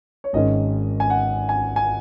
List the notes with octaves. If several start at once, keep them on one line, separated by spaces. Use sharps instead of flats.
C#5
G#1 G#2 D#3 G#3 C#4 D#5
G#5
F#5
G#5
G#5